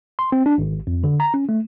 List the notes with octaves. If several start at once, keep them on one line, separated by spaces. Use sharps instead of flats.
C6
C4
D4
G#1
F2
D3
A#5
C#4
A3